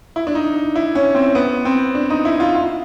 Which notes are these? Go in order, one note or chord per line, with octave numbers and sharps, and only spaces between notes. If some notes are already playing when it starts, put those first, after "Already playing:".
E4
D4
D#4
E4
C#4
C4
B3
C4
D4
D#4
E4
F4
F4